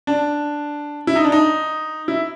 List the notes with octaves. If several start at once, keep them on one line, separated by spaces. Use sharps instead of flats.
D4
E4
D#4
D4
D#4
E4